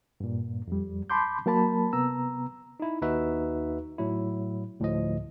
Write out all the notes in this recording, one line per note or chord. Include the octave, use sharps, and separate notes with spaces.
G2 A#2
F2 G3
A5 B5 C6 D6 G6
F#3 A#3 A#4 A5 B5
C3 B3 A#5 E6
D#4 E4
D#2 D#4 F#4 B4 E5
A2 F#3 E4
D2 A2 F3 D#5